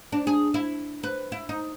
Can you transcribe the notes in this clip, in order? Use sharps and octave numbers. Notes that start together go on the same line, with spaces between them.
D4
G#4
E4
B4
E4
D#4